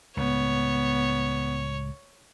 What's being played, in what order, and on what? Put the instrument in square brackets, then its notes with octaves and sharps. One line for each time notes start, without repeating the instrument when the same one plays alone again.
[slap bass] C#2 A2 [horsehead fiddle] B3 [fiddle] C#5